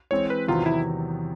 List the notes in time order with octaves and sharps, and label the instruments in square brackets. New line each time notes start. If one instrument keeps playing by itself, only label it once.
[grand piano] E3 G#3 C4 [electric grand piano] C#5
[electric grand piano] B4
[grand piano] E2 C3 D#3 F#3 B3 [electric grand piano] F4
[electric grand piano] E4